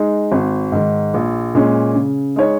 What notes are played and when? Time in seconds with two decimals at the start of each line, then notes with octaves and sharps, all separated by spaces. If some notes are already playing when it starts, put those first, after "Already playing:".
Already playing: G#3 D#4
0.32 G#1
0.72 G#2 D#3
1.14 A#1
1.55 A#2 G#3 C#4
1.95 C#3
2.36 G#3 D#4 C#5